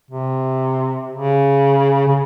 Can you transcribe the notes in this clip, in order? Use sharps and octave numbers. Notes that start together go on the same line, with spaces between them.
C3
C#3
C#3